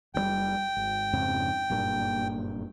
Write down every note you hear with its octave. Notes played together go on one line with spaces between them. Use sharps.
F#1 B2 G3 G5
G#1
F2 G#2 C#3
F#1 G2 A#2